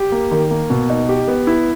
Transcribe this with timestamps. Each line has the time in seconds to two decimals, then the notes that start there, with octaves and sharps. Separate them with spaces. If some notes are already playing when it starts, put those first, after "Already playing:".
Already playing: G4
0.12 A#3
0.31 D#3
0.51 A#3
0.70 B2
0.90 D#4
1.09 G4
1.28 B3
1.47 E4